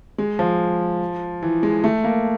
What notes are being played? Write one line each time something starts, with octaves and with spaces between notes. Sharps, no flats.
G#3
F3
E3
G#3
A3
A#3